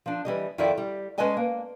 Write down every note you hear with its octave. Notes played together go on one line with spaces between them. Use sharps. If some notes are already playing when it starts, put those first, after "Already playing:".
F3 D4
E3 G3 D#5
F2 D#3 E4 F4 D5 E5
G3
G#3 C#4 B4 D#5 G#5 A5
A#3